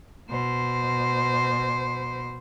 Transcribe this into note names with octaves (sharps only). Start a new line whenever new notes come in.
B2 C5